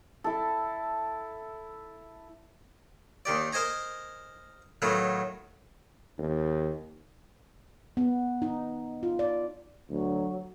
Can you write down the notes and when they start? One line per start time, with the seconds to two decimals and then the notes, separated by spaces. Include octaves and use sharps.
0.24 E4 A4
3.25 D#2 D#3 G4 D5
3.52 A#4 C5 D#5 G#5 A#5
4.82 A2 D#3 F#3 B3 F4
6.18 D#2
7.97 B3
8.42 D#4
9.03 F4
9.19 D5
9.90 D2 F#3